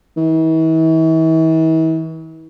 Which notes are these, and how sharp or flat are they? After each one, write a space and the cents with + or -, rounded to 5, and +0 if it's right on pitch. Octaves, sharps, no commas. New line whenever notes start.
E3 -40